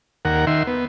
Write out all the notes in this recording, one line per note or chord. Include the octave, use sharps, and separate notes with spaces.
D#2 A#4 F#5
D#3 E5 C6
B3